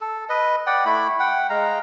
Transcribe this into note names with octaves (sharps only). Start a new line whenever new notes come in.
A4
B4 D#5
D5 F#5 G5
A3 E4 B5
F#5 G5
G#3 F5 A#5